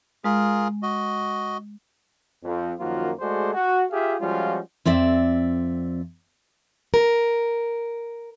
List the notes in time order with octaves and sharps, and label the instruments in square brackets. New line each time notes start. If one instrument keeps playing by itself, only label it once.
[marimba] G#3 [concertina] F4 G#4 A#4
[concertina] F#4 D#5
[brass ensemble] F2
F#2 D#3 F3 A#3 F4 F#4
G#3 A3 F#4 G#4 C5 D5
F#4
F4 G4 G#4 E5 F5
F3 G3 G#3 C#4 F4 F#4
[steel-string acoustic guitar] F2 C4 D5 E5
A#4